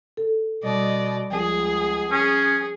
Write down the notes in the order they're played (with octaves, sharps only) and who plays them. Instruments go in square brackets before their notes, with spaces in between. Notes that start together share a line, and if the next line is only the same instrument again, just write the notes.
[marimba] A4
[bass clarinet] B2 [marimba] G3 [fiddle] D5 D#5
[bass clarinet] C#2 [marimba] F3 [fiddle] G#4
[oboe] C#4 [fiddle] G#4